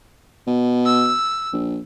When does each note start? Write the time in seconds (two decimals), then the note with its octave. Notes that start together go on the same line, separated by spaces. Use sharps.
0.47 B2
0.86 E6
1.53 A#1